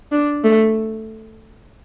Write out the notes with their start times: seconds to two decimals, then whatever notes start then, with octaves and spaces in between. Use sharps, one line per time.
0.12 D4
0.44 A3